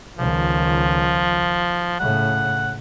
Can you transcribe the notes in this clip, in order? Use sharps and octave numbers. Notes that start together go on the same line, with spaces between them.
C#2 D#3 F3
A2 C#3 F#5